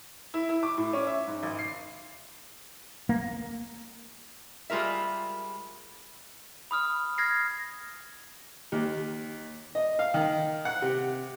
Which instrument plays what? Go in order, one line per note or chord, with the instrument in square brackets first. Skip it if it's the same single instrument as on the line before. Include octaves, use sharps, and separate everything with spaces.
[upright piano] E4
E4
D6
A2
C#4
E5
G#2
G#1
C7
[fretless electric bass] A#3
[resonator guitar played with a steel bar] G3 G#3 F4 A#4 E5
[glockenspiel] B5 D#6 F6
F6 G#6 A#6 C7
[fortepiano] D#2
D#5
F5
D#3
F#5
C3